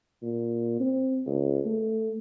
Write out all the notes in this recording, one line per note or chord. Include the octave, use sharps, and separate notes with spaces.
A#2
C4
C#2
A3